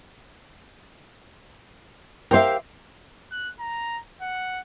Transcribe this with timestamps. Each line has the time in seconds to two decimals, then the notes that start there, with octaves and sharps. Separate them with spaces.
2.31 G4 A#4 C5 E5 F5
3.31 F#6
3.60 A#5
4.22 F#5